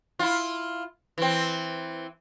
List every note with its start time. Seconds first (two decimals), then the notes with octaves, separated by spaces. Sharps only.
0.19 E4 F4
1.18 E3 C4